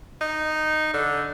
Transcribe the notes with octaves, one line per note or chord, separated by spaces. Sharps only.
D#4
D3